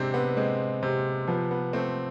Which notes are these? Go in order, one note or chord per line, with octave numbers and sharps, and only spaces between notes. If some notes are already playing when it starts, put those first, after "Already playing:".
Already playing: C3 G#3 C4 D4
B3
G#3 C4
C3
F3 B3
B3
A3 C4